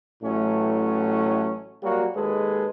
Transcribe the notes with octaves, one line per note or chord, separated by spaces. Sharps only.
A1 A2 F#3 A3 C#4
F#3 G3 A#3 F#4
D#2 G#3 G#4 A4 B4